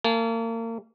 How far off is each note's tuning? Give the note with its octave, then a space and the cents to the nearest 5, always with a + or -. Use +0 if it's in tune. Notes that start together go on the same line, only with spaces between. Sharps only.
A#3 -35 A5 -35